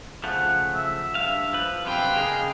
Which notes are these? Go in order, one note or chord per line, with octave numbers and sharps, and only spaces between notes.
C#3 F3 A3 F#5
E5
G2 F5
F3 B4
F#2 C3 D4 B4 F5 G5
C#3 G#3 A#3 G#4